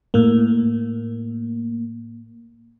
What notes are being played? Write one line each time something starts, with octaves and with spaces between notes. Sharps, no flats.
A2 A#3